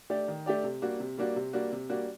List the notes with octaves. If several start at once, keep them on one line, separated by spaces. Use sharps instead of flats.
A3 D4 G4 D5
D#3
A3 D4 G4 D5
C3
G3 A#3 D4 F#4
C3
G3 A#3 D4 F#4
C3
G3 A#3 D4 F#4
C3
G3 A#3 D4 F#4